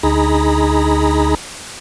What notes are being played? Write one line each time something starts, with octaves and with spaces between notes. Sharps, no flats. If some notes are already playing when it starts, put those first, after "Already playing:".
D2 D#4 G#4 A#5 B5